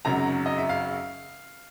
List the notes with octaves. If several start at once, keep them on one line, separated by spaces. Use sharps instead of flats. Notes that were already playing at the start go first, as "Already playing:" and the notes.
G#1 F#2 C#3 F#3 A#5
D#5
E5
F5